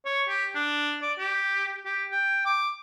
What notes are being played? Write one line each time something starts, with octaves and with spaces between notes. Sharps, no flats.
C#5
G4
D4
D5
G4
G4
G5
D6